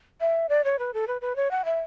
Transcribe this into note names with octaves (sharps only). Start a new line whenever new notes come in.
E5
D5
C#5
B4
A4
B4
B4
C#5
F#5
E5